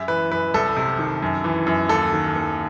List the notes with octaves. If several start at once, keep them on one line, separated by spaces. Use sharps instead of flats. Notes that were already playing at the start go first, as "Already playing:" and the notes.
Already playing: F#2 E5
E3 B4
F#2 B4
C2 A4
C3
D#3
F#2
E3
F#2
D#2 A4
D#3
D#2